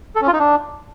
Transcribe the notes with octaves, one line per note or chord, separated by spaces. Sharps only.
A4
C#4
F4
D#4
D4